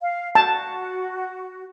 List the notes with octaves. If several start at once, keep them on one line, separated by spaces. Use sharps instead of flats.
F5
F#4 A5